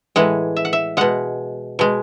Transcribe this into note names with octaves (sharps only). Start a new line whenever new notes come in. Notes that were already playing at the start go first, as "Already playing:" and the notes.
A2 E3 G#3 F#5
E5
F#5
E5
B2 G#3 F#5
B2 G#3